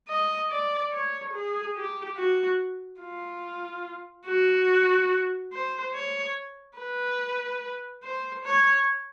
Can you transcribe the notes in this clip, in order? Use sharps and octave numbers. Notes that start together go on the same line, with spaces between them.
D#5
D5
C#5
G#4
G4
F#4
F4
F#4
C5
C#5
B4
C5
C#5